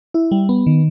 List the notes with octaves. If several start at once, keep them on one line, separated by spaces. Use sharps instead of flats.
E4
G3
B3
D#3